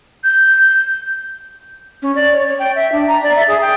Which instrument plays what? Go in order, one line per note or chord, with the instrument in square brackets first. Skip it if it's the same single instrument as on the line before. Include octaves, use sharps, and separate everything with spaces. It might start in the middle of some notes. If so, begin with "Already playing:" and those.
[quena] G6
[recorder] C#4
D5
C#5
C#5
G5
E5
D4
A#5
D5
E5
G#4
G5